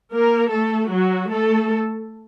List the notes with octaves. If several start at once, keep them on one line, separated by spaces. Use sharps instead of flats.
A#3 A#4
A3 A4
F#3 F#4
A3 A4